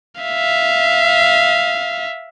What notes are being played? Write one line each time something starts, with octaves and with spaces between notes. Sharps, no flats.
E5 F5